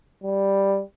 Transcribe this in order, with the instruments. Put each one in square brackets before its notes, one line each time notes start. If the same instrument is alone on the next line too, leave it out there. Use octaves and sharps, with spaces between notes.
[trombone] G3